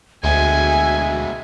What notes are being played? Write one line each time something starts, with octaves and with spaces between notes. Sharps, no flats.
D2 B2 G#3 E5 G#5